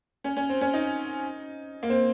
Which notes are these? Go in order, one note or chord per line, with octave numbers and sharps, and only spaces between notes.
C#4
C#4
C4
C#4
D#4
A#3
C4